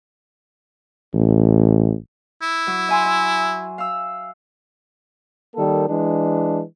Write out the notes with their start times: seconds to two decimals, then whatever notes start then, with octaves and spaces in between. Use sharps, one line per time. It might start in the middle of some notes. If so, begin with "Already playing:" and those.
1.14 A1
2.42 E4
2.67 F#3
2.88 E5 G#5 C6
3.05 E5
3.78 F5 E6
5.55 D#3 G3 A#3 A4
5.88 E3 G#3 D4